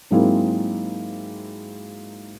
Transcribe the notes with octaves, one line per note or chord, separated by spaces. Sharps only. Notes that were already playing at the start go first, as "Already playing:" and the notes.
G#2 F#3 G#3 A#3 C4 E4